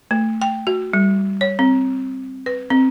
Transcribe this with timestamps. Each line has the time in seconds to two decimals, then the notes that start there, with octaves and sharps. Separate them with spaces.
0.11 A3
0.42 G5
0.67 F#4
0.93 G3
1.41 C#5
1.59 C4
2.46 B4
2.70 C4